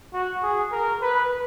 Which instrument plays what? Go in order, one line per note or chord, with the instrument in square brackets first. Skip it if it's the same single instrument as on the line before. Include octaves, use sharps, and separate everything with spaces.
[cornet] F#4
G#4
A#4
B4